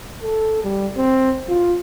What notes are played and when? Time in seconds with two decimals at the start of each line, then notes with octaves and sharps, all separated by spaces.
0.23 A4
0.64 G3
0.97 C4
1.49 F4